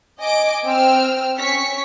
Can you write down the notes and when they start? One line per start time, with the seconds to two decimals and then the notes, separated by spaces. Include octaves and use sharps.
0.21 D#5 G#5 D6 D7
0.64 C4 G5 E6 F6
1.39 C#4 C#6 B6 C#7